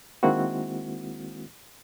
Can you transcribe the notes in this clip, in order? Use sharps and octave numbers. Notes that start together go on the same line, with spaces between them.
D#3 G#3 A#3 C4 E4 F#4